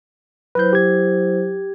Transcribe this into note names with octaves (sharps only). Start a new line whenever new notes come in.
F#3 E4 B4 C5 G6
G4 G#6